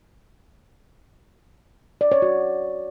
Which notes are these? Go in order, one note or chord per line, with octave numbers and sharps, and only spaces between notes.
D5
C#5
F#4